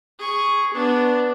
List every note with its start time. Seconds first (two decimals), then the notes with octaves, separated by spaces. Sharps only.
0.19 G#4 C#6
0.73 B3 D4